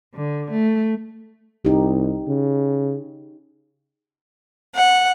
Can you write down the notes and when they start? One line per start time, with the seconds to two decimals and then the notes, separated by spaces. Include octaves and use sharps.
0.15 D3
0.51 A3
1.65 C2 D#4 G4
2.28 C#3
4.75 F#5